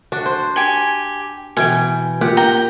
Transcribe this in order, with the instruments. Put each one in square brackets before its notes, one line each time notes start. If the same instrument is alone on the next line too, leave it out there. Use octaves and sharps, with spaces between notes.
[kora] D4 F#4
C5
[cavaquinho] G4 G#5
[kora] B2 E3 G5 [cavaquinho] G#5
[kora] A#2 G4 F#5
[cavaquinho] G5 A#5